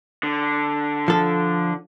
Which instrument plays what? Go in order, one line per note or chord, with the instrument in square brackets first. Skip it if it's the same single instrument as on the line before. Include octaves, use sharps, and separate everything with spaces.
[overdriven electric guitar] D3
[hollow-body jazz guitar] F3 A4